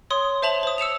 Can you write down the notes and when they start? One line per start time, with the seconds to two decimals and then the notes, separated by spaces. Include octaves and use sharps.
0.10 C#5 C6 D#6
0.42 C5 E5 A5 F7 F#7
0.63 C5 D#6
0.78 E6 C#7 E7 F7